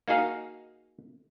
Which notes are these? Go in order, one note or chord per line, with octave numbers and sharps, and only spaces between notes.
A#3 D#4 F#4 G#4 F5